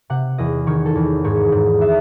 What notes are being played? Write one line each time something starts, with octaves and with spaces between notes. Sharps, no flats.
C3 F#5
E2 D#5
D#3 C#5
A4
E2
G#2 C#5
G#2
E5